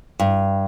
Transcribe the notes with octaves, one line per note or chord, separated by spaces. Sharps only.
G2